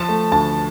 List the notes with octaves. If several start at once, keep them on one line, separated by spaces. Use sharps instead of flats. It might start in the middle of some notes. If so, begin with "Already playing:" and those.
Already playing: F3 A5
A3
D2 A5